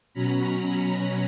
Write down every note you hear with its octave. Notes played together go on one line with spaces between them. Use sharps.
B2 F#3 C#4 A#5 B5